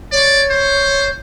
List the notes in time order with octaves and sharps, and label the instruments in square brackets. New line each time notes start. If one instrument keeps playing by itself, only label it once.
[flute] C#5 [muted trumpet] D5
[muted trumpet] C5